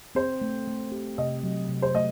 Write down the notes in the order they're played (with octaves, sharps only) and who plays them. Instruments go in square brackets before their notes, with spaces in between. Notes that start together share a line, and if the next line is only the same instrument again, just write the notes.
[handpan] C4 [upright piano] C5
[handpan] A3
A3
G4
[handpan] C3 [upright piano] D#5
[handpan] F#3
C3
[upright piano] C5
[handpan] A3 [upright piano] D#5